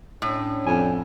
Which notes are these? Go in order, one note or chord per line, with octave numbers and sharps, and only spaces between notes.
A2 C#4 D4
F2 G#5